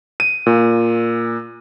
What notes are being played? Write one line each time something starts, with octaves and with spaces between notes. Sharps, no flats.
D#7
A#2